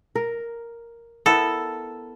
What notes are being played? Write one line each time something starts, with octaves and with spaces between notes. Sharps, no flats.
A#4
B3 E4 A4 A#4